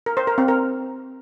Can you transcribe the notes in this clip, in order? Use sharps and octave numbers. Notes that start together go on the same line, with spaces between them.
A#4
C5
A#4
C4
A#4